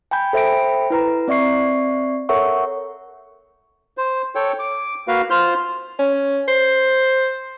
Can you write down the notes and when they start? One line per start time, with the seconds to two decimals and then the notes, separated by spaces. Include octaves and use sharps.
0.11 G5 G#5 B5 G6
0.33 A4 C5 E5 G5 B5 D7
0.90 E4 B4 A#5
1.28 C4 D5 E5 C#6 C7
2.29 A4 A#4 C#5 E5 F#5 C#6
3.98 C5
4.35 A4 C#5 G5
4.59 D6
5.08 A#3 F#4 B4 F5
5.30 F4 C5 F6 G6
5.99 C#4
6.48 C5